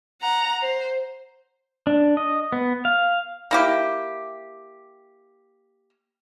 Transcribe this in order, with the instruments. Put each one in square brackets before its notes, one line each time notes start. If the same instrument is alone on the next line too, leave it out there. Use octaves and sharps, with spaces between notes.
[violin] F#5 A#5
C5
[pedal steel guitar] D4
D#5
B3
F5
[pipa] A#3 E4 G4